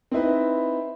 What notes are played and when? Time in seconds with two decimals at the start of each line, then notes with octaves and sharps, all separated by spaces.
0.11 C4 D#4 E4 B4